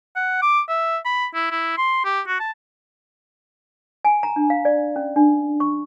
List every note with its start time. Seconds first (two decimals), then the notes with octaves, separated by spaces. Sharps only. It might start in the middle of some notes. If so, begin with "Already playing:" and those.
0.16 F#5
0.42 D6
0.69 E5
1.05 B5
1.34 E4
1.51 E4
1.78 C6
2.05 G4
2.27 F#4
2.40 A5
4.05 G#5
4.23 A#5
4.36 D4
4.50 F5
4.65 D5
4.96 C#4
5.16 D4
5.60 C#6